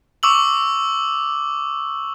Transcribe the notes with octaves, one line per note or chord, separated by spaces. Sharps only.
C#6 D6 E6 F#7